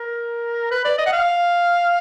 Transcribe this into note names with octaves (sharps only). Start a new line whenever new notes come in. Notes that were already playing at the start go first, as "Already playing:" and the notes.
Already playing: A#4
B4
D5
D#5
F#5
F5